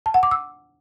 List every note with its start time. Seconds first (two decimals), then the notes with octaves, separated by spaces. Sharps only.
0.06 A5
0.14 F#5
0.23 D6
0.31 E6